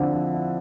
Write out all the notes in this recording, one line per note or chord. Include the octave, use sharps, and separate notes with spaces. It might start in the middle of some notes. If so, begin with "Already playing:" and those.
Already playing: D3 F3 C4 E4
F3
E4